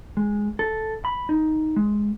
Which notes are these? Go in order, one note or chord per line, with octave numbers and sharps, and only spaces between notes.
G#3
A4
B5
D#4
G#3